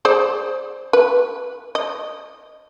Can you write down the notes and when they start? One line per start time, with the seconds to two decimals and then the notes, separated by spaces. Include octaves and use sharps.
0.05 G#4 C5 D5
0.93 B4
1.75 D#5